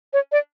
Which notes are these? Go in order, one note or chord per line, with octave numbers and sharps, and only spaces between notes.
C#5
D5